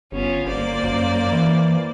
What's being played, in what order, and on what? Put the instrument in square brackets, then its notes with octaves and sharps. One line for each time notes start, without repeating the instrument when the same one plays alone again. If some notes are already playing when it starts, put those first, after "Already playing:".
[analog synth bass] G1 [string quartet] B3 C#4 F4
[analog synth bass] G1 [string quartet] A#3 C5 D5
[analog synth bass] F#2
E3